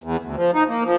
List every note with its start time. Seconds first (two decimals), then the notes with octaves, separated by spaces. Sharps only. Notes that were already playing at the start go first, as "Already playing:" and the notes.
0.04 E2
0.22 D2
0.36 F3
0.54 D#4
0.69 A#3
0.85 F3